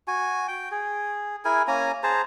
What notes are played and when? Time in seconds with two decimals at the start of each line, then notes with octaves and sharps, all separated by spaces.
0.08 F#4 G#5
0.48 G5
0.71 G#4
1.45 E4 G#4 A#4 G#5
1.68 A#3 C#4 G#5 A#5
2.03 G#4 C5 A5 A#5